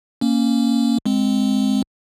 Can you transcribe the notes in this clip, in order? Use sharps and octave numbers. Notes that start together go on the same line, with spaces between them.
A#3 C#4
G#3 C4